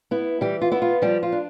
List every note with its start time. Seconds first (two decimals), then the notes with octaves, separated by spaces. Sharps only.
0.11 B3 E4
0.41 E3 G3 G4
0.61 F4
0.72 B3 E4
0.82 F4
1.02 F3 G3 G4
1.23 F4
1.32 D4